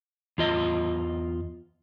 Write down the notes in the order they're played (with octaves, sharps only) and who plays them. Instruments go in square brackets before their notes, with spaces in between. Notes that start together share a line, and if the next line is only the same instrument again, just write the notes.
[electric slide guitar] E2 F4 D#5